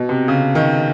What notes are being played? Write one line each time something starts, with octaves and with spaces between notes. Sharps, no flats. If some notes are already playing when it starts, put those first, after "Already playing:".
Already playing: B2
C3
C#3
D#3